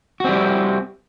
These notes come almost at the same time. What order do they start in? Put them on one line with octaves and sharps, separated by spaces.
F#4 C4 G3 E4